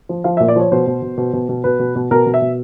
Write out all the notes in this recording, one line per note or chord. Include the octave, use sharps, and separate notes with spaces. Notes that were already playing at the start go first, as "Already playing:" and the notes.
F3
F3 F5
E5
A#2
D5
F3 C#5
B2 C5
B2
B2
B2
B2
B2
B2 B4
B2
B2
B2 A#4
B2
E5
B2